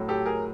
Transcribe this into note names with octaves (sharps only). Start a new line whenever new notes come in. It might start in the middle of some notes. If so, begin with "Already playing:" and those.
Already playing: A2 F#3 A3
G4 A4
G#4 A#4